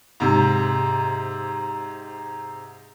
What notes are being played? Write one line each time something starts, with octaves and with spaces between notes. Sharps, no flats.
G#2 C3